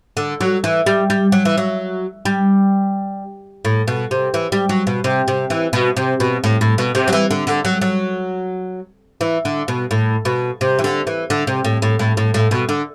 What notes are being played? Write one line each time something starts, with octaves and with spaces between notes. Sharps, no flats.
D3
F#3
E3
G3
G3
F#3
E3
F#3
G3
A2
B2
C3
E3
G3
F#3
B2
C3
C3
E3
B2
C3
B2
A2
A2
B2
C3
F#3
E3
D3
D3
F#3
F#3
E3
D3
B2
A2
B2
C3
E3
D3
E3
D3
C3
A2
A2
A2
A2
A2
B2
D3